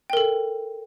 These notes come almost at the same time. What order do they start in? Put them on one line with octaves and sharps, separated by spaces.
G5 A#4 A4